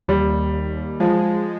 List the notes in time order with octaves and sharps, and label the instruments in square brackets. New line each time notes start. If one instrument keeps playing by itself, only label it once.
[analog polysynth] D#2 [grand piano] G3
[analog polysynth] D#2
D#2
D#2
[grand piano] F3 [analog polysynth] G#3
[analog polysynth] G#3